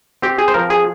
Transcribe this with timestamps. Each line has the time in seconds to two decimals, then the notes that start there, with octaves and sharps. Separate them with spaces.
0.22 C4 G4
0.39 G#4
0.48 C5
0.54 F3 A#4
0.70 G#4